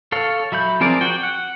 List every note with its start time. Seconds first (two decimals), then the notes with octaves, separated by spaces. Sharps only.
0.12 A4 C#5 F5
0.52 F#3 E5 B5 G6
0.80 F3 C4 G#4 A#4 D5
1.01 F#4 G5
1.23 F#5